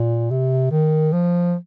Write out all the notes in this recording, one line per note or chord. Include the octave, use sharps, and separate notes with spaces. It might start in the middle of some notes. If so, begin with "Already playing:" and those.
Already playing: A#2
C3
D#3
F3